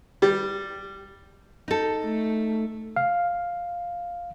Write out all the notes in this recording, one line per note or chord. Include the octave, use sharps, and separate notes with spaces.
G3
D#4 A4
A3
F5